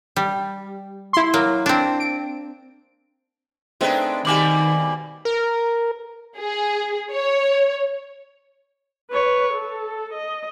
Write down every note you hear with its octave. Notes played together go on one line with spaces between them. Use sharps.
G3
E4 C6
F#3 A#3
C4 D4
D7
G#3 A3 C4 D4 D#4 B4
B2 D#3 G3 A#3 G#5 D6 F#7
A#4
G#4
C#5
B4 C#5
A4
D#5